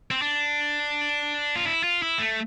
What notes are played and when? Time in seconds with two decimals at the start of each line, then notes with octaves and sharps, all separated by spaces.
0.11 C4
0.22 D4
1.56 F4
1.66 E4
1.84 F4
2.02 E4
2.19 A3